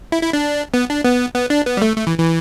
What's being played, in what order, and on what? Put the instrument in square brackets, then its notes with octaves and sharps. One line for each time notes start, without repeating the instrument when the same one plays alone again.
[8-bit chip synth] E4
E4
D4
B3
D4
B3
B3
D4
B3
G3
A3
A3
E3
E3